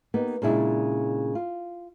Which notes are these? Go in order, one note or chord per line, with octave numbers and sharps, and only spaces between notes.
A#3 B3 D#4 G4
A#2 C#3 G#3 D4 E4
F4